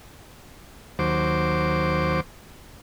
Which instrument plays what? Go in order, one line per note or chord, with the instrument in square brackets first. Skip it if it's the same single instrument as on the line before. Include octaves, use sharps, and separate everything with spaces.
[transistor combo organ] D#2 F#3 C5 D6